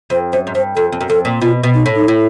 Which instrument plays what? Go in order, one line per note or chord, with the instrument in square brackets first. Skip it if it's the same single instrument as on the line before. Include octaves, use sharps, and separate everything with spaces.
[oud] F2 [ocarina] C5
[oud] F#2 [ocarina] C5
[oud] G#2
[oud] G2 [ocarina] C5
[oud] F2 [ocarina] A4
[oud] F2
F#2
[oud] F2 [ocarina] A4
[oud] A#2
[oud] B2 [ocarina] F4
[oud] B2
[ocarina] D#4
[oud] A2
[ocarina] D#4
[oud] A2 [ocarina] E4